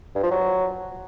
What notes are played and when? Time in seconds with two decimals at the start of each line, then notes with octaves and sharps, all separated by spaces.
0.15 G2
0.23 F3
0.31 F#3